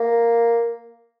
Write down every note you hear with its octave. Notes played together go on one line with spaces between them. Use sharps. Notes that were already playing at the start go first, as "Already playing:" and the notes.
Already playing: A#3